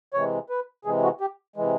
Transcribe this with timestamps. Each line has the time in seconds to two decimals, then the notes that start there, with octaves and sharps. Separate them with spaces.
0.14 C3 E3 G#3 C#5
0.50 B4
0.85 C3 E3 G#3 G#4
1.03 F#4
1.21 G4
1.56 C3 E3 G#3